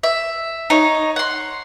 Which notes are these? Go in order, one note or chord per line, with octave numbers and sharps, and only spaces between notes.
E5
D#4 C#5
F#5 C6